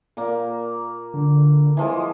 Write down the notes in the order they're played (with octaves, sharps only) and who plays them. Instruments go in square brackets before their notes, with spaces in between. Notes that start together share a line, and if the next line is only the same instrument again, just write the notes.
[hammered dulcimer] A#2 A#3
[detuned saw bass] D3
[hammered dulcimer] E3 F3 G#3